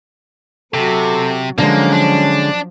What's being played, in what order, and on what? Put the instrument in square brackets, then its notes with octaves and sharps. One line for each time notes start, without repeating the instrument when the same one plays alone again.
[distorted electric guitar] C3 [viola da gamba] F#3 F#4 [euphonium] A4
[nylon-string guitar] D3 G#3 [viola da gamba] F3 F#3 [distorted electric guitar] A#3 [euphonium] C#4
[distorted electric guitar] D4